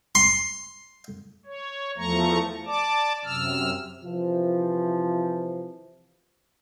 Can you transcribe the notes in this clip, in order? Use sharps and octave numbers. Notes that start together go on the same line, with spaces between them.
C6
C#5
E2 F3 A3 A#5 C#6
D5 A5 D6
F#2 C3 E6 F6
C3 E3 F3